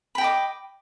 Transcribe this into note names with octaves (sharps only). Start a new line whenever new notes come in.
D#5 G5 B5 D6